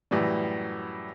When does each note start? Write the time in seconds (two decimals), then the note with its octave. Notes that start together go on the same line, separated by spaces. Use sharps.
0.11 F#2 A2 E3 G3